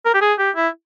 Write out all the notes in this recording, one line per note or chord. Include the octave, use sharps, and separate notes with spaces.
A#4
G4
G#4
G4
E4